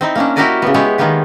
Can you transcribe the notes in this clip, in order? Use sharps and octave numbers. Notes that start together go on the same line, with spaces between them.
C4 D#4 E4
A#3 C#4 D4
E4 F#4 G4 A#4 D5 D#5
C#3 B3
G#3 B3 E4 G4 C#5
D#3 G#3 A#3 B3 G4